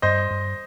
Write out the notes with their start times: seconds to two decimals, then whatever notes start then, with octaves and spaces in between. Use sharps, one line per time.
0.02 G2 C5 D#5
0.31 G2